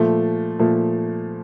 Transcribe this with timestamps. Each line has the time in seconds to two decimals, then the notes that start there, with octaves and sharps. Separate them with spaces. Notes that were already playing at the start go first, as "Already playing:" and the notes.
Already playing: A#2 F3 A3
0.59 A#2 F3 A3